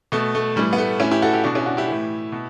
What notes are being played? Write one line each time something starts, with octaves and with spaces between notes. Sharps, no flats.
B2 A3
A3
A2 E3 G3
B3
A3
A2 E3 C#4 E4
E4 G4
F#4 A4
E4 G4
B2 D4 F#4
C#4 E4
D4 F#4
E4 G4
A2 E3
B2